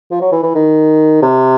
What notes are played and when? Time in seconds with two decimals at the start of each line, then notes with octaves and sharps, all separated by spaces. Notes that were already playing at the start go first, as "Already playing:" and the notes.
0.11 F3
0.21 F#3
0.32 E3
0.43 E3
0.55 D#3
1.22 C3